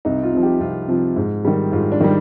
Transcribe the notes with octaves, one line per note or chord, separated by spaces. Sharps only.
C2 D#4
F4
C3 F3
G4
C2 F4
C3 F3
G#2
D#3 G3
G#2 F4
D4
D#3 G3